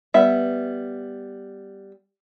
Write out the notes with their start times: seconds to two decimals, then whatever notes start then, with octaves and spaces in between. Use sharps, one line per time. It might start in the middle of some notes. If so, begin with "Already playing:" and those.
0.14 G3 B3 E5